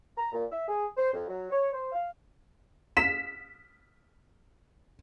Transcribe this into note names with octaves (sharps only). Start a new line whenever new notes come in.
A#5
A#2
E5
G#4
C5
F2
F#3
C#5
C5
F5
B6 E7